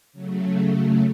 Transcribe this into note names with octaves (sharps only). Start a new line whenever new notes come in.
C#3 F#3 A3